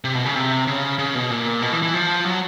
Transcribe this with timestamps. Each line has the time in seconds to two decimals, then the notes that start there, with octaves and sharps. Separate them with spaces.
0.04 C3
0.15 B2
0.25 C#3
0.36 C3
0.67 C#3
0.99 C#3
1.15 B2
1.31 A#2
1.62 B2
1.72 E3
1.83 E3
1.94 F3
2.25 F#3